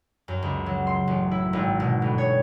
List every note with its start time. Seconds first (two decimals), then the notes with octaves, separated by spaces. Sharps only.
0.28 F#2
0.42 C#2
0.66 F#3
0.87 C6
1.07 A1
1.31 E4
1.53 G#1
1.80 B2
2.02 G1
2.18 C#5